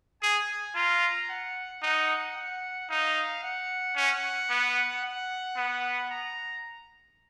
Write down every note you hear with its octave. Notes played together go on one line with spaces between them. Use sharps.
G#4 G#5
F4 A#5
F#5
D#4 F#5
F#5
D#4 F5
F#5
C#4 F#5
B3
F#5
B3
A#5